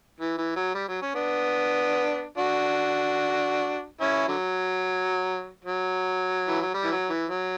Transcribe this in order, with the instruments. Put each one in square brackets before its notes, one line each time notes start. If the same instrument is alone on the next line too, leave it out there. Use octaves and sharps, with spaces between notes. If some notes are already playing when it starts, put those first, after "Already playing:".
[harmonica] E3
E3
F#3
G3
F#3
C#4
B3 D4
D4 F#4
C#4 E4
D3 F#3
F#3
E3
F#3
G3
E3
F#3
E3
F#3